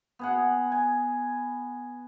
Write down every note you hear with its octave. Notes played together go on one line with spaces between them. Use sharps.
B3 G#4 F#5
G#5